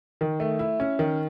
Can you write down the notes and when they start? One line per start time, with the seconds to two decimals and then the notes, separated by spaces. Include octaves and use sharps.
0.21 D#3
0.40 A3
0.59 E4
0.80 C#4
0.99 D#3